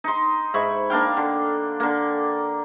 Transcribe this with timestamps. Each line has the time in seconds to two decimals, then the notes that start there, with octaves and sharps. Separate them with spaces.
0.04 D#4 C6
0.54 G#2 E4 B5 C#6
0.90 A#3 D4 F5 G5
1.17 D3
1.80 D3 A#3